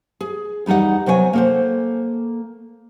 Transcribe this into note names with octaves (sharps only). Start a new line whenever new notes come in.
G#4
E2 G3 D#4 D5 F#5
C3 F#3 B3 C#5 F5 G#5
A#3 A4 C5